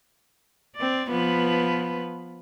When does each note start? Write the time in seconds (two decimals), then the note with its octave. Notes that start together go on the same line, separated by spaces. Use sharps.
0.76 C4 D5
1.09 F3 B3 B4